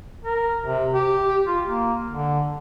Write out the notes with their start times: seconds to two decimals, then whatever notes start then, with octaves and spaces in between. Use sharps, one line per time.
0.24 A#4
0.64 C3
0.94 G4
1.47 F4
1.66 A#3
2.10 D3